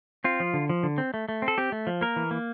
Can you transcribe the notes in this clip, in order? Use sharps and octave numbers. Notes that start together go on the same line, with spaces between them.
C4 F4
F3
D3
F3
D3
C4
A3
A3
C4
A4
C4 G4
A3
F3
A#3 A#4
E3
A#3